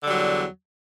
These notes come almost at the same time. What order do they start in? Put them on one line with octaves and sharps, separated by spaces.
D3 G3 F#3 E2